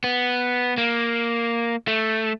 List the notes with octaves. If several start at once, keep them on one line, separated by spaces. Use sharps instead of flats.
B3
A#3
A3